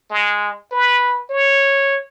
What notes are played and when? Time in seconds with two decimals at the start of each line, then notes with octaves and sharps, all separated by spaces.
0.11 G#3
0.72 B4
1.30 C#5